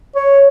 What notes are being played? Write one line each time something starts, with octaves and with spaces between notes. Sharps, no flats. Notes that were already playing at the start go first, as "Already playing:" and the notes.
C#5